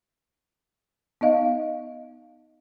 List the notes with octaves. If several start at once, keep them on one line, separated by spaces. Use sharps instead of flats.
B3 D#4 D#5 F5